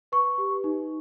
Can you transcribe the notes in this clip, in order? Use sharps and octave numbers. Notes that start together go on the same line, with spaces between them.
B4 C#6
G4
D#4